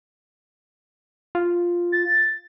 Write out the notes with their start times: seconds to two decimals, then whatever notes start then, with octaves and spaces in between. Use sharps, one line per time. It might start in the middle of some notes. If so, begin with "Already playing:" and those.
1.35 F4
1.92 A6